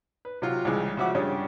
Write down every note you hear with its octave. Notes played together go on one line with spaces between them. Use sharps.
B4
C3 F#3 F4
C2 C#3 E3 G#3
C#3 F3 F#4 E5 F#5 D6
G2 C#3 C#4 D4 G4